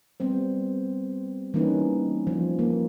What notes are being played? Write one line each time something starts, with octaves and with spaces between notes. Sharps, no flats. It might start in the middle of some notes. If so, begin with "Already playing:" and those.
G3 B3 C4 C5
E3 G3 A#3 C#4 D#4 B4
F3
A#3